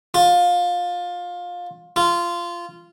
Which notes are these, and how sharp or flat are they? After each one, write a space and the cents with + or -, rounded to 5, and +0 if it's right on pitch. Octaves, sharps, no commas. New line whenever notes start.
F4 +20
F4 -15